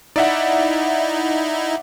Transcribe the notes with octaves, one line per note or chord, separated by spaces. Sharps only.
D#4 E4 D5 E5 F#5